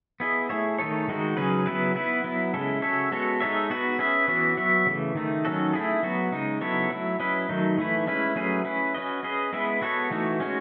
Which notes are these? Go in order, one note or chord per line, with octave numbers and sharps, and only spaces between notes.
B3 E4 G#4 D#5
A3 E4 G#4 C#5 E5
D#3 A3 D#4 A4 C#5
D#3 G#3 D#4 F#4
C#3 F#3 C#4 G#4 B4
F#3 B3 E4 B4
B3 E4 B4
F#3 B3 E4
C#3 G#3 C#4 E4 A4
C#4 F#4 A4 C#5 E5
G#3 B3 F#4 A4 C#5
G#3 D#4 A4 C#5 E5
B3 F#4 B4
C#4 G#4 B4 E5
E3 B3 F#4 C#5 E5
F#3 B3 F#4 C#5 E5
C#3 E3 A3
D#3 A3 D#4
D#3 F#3 C#4 F#4 A4
A3 E4 G#4
F#3 B3 F#4
C#3 G#3 D#4
F#3 B3 E4 A4 C#5
F#3 A3 E4
F#3 C#4 E4 B4 D#5
D#3 F#3 A3 D#4
E3 A3 E4 B4
G#3 C#4 E4 B4
F#3 A3 C#4 G#4 B4
C#4 E4 B4
C#4 F#4 B4 D#5
C#4 G#4 B4 D#5
G#3 B3 E4 B4 E5
B3 F#4 A4 C#5
E3 A3 D#4 F#4
G#3 C#4 F#4 C#5